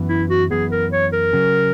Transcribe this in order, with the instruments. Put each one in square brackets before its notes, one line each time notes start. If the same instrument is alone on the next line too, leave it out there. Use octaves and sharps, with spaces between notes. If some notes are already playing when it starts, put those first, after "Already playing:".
Already playing: [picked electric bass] F#2 E3 B3
[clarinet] E4
F#4
[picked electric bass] F#2 E3 B3 [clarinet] G#4
[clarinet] A#4
C#5
A#4
[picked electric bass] C#3 F#3 C#4